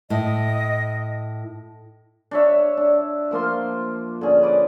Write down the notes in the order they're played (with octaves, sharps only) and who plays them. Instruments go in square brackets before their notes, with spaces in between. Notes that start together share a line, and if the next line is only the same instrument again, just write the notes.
[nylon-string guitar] A2 [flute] D#5
[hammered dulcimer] D4 C#5 E5
D4
F3 A#3 F4 C6
D3 C#4 G#4
B4 D5 D#5